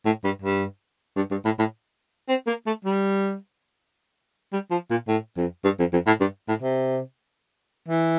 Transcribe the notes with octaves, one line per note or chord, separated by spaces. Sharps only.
A2
G2
G2
G2
G2
A2
A2
C4
A#3
A3
G3
G3
F3
A#2
A2
F2
G2
F2
F2
A2
G2
A2
C3
E3